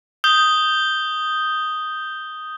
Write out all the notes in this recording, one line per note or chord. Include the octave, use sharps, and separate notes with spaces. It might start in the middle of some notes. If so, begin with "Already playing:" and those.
D#6 G6 G7